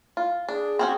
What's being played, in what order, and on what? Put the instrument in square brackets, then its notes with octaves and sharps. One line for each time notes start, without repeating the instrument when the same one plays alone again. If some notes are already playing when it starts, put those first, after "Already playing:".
[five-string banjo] F4
[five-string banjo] D4 [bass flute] G#4
[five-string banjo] C4 C#4 F#4